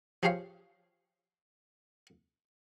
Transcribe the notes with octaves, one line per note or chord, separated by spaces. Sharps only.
F3 G4 G#4 C5 C#5 F5